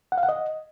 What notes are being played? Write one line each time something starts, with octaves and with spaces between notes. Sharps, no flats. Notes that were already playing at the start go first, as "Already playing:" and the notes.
F#5
F5
F#5
D#5